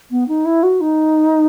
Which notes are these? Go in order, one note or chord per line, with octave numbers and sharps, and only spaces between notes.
B3
D#4
E4
F#4
D#4